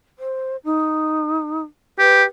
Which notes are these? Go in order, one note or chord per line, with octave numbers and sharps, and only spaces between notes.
C5
D#4
G4 B4